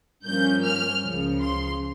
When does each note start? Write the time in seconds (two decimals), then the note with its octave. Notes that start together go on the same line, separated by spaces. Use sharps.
0.25 G2 F3 A#3 C#4 G6
0.63 F6
1.02 C#2 C#3 F3
1.41 C6